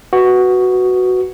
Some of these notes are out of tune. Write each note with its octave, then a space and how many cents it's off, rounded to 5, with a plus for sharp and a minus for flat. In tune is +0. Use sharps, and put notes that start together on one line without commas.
F#4 +5 B4 +0